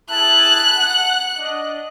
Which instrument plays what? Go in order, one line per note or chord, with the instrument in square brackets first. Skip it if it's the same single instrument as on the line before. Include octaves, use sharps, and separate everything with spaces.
[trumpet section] E4 G#4 A5 [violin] F#6
[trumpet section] F#5
D4 D#5